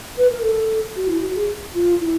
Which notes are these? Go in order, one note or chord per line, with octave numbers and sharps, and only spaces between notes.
B4
A#4
A4
F#4
E4
F#4
G#4
F4
E4